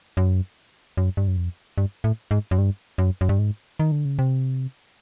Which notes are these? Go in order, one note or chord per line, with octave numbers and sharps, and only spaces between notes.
F#2
F#2
G2
F#2
F2
G2
A2
G#2
F#2
G2
F#2
F#2
G2
G#2
D#3
D3
C#3
C3